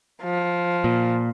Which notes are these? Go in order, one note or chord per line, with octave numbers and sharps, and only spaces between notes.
F3
A#2